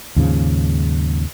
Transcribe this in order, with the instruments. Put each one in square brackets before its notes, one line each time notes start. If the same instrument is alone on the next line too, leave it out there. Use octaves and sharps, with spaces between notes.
[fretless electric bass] D#2 G#2 C#3 F3